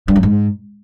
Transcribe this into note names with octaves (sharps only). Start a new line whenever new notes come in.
G2
F#2
G#2